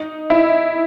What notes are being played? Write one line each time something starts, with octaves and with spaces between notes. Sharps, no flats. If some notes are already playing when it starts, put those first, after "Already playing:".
Already playing: D#4
E4